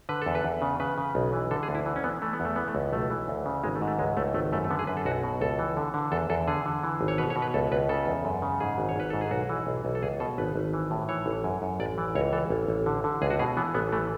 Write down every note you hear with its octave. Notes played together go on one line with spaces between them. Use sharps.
D3 B4
E2 A4
B4
E2
C#3
C#3 B4
C#3
B1
E3
D3 A4
G#4
D2
E4
E3
C#4
E3 B3
E3 A3
B3
E2
A3
E3 B3
A3
C#2
B1 A3
E3
D2
C#3
G#1 G#3
A3
G#2
A3
C#2 G#3
C#2 A3
G#1 A3
F#2 A3
A3
D3 B3
G#4
F#2 B4
A4
B1 F#4
B2
C#2 A4
E3
D3
D3
E2 A4
E2 A4
D3 G#4
D3
E3
G#1
C#5
B2 B4
C#5
B2
B4
C#2 A4
C#2 B4
C#3 A4
E2
F#2
C#3
G#2 G#4
G#1
C#5
G#1 B4
G#2 A4
G#4
B1 F#4
E3
B1
B1
A4
C#2 G#4
B2 A4
G#1 B4
G#1
E3
A2
E3 C#5
A1
F#2
F#2
A1 D5
E3
C#2 C#5
E3 A4
A1
A1
D3
D3
C#2 G#4
F#4
B2 G#4
E3 B3
A1 B3
E3 A3